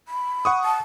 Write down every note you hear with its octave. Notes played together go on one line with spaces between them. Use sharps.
B5
F#5 C#6 D#6
A5